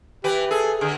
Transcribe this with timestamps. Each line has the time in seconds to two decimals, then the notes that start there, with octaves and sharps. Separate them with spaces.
0.24 E3 G4 B4
0.51 G#4 A4
0.81 D3 G#4